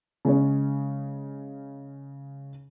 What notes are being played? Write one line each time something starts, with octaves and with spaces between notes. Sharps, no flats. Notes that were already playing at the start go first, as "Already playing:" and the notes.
C#3 G#3 C#4